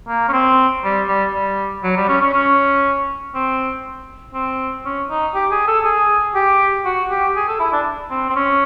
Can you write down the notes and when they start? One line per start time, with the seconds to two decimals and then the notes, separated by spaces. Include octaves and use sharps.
0.08 A#3
0.29 C#4
0.33 C4
0.84 G3
1.08 G3
1.33 G3
1.84 F#3
1.97 G3
2.08 C#4
2.21 C#4
2.33 C#4
3.35 C4
4.34 C4
4.85 C#4
5.10 D#4
5.34 G4
5.51 G#4
5.68 A4
5.85 G#4
6.35 G4
6.85 F#4
7.10 G4
7.36 G#4
7.48 A4
7.60 E4
7.72 D4
8.11 C4
8.30 C4
8.36 C#4